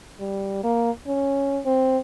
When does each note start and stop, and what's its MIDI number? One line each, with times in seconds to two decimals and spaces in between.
0.20 0.63 55
0.64 0.90 58
1.07 1.61 61
1.66 1.98 60